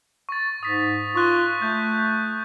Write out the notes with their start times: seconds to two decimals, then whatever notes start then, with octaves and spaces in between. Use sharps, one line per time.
0.29 C#6 A6
0.63 G#2 D#6 B6
1.16 F4 C#6 F#6
1.62 A3 G6